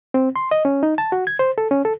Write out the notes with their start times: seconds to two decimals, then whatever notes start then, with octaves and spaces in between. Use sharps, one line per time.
0.14 C4
0.36 C6
0.51 D#5
0.65 C#4
0.83 D#4
0.98 A5
1.12 F#4
1.27 G#6
1.39 C5
1.58 A4
1.71 C#4
1.85 A4